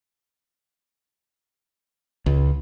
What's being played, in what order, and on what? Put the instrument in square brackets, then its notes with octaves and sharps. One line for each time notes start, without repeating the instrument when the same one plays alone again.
[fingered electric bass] C#2